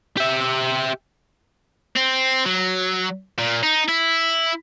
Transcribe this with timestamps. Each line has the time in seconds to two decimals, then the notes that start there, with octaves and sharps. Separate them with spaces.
0.17 G4 E5
1.96 C4
2.46 F#3
3.39 A#2
3.63 D#4
3.89 E4